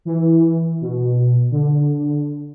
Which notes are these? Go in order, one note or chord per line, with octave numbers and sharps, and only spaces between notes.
E3
B2
D3